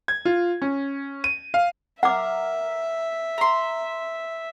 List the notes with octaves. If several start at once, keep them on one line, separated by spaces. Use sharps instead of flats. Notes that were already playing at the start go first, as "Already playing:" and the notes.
G#6
F4
C#4
D#7
F5
A#4 E5 F#5 D6
A#5 C6